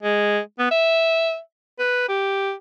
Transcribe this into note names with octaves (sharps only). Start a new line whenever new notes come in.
G#3
B3
E5
B4
G4